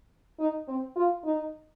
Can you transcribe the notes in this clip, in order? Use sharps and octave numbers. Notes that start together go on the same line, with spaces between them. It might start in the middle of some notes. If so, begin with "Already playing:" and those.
D#4
C4
F4
D#4